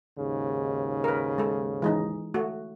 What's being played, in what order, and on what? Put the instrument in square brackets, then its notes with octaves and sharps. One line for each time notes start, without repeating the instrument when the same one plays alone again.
[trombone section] D#2 G#2 C#3
[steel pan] A#4 B4
G#3 A4
E3 G#3 D#4
A3 F#4